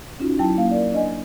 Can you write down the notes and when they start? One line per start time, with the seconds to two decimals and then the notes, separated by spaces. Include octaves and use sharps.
0.20 C#4 D#4 F4 F#4
0.39 F#3 E4 G5 A5
0.57 A#3 F5
0.71 A#4 D5
0.93 D4 D#5 G#5